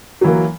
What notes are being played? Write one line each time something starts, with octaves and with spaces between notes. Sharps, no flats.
E3 F#3 A#3